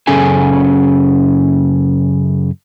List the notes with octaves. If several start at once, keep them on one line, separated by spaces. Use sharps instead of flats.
F#2 C#3 C#4 G#4 A4 G#5